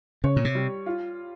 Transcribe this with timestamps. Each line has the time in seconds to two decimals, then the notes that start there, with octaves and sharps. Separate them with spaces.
0.24 C#3 C#5
0.36 A#2
0.45 C3
0.55 G3
0.86 F4